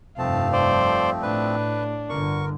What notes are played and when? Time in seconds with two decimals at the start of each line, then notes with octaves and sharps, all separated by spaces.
0.18 F1 G2 F3 A3 C4 F5 A5
0.52 C5 D5
1.23 A2 D4 B4
2.10 G1 D3 A#4 C#6